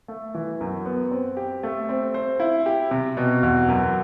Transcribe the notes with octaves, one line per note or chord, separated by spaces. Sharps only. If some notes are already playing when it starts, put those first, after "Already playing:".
A3
E3
F#2
B3
C4
G4
A3
C4
C5
E4
G4
C3
B2
E2
F#2